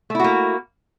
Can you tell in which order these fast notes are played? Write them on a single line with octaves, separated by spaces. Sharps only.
A3 E4 F#4 A#3